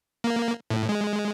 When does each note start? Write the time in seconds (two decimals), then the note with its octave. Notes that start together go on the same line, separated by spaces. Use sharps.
0.24 A#3
0.70 A2
0.89 G#3